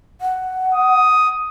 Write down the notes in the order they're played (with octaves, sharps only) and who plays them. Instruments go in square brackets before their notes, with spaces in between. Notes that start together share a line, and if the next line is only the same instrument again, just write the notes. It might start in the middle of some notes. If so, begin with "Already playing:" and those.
[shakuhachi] F#5
[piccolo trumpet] D#6